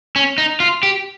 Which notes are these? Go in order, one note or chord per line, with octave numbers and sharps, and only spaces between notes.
C#4
D#4
F4
G4